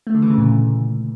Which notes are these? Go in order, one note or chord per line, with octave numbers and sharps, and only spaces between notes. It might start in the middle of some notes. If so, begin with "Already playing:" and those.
A3
D3
E3
C#3
A#2